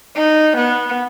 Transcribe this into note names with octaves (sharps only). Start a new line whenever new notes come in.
D#4
B3